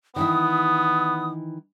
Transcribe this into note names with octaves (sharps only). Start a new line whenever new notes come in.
D#3 E3 B3 E4 D#6